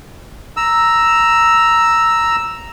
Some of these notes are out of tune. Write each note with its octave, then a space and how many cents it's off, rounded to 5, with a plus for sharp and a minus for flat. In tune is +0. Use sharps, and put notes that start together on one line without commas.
A#5 +0 E6 +0